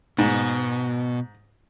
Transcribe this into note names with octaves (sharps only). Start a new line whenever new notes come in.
G#2 B2